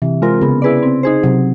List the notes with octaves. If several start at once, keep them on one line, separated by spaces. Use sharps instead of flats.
C3 E3
G#3 C4 F4 A#4
C#3 B3
E4 G#4 B4 D5
C4
D#4 G#4 C5
C3 F#3